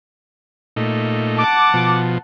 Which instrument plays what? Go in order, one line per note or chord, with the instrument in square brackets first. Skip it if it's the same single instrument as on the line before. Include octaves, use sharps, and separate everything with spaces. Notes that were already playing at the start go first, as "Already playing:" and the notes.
[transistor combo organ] A#2 A3 D#4
[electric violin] F#5 A5 [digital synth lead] D6
[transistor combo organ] B2 F3